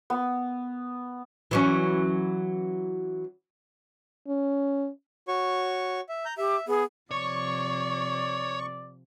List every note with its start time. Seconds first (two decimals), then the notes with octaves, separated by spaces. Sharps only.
0.10 B3
1.51 E3 F#3 C#4
4.28 C#4
5.28 F#4 C#5 C#6
6.09 E5
6.25 A#5 G6
6.38 G4 E5
6.68 B3 G#4
7.11 C3 F3 C#5 D5 C#6